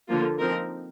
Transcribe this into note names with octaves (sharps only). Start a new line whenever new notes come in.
D3 F3 A#3 F4
F3 C4 D#4 A#4